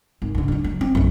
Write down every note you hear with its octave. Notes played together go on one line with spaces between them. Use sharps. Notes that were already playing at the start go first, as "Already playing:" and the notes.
G#1
G2 D3
F#3 D4
F#3
C4
A#1 F#2